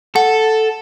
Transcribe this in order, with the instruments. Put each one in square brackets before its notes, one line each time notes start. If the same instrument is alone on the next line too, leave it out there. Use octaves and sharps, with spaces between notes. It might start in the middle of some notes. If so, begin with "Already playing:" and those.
[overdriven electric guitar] A4 [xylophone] F#5